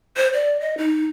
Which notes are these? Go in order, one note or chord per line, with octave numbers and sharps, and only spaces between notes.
C5
D5
D#5
D#4